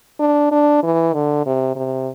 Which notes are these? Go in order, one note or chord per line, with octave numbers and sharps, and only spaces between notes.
D4
D4
E3
D3
C3
C3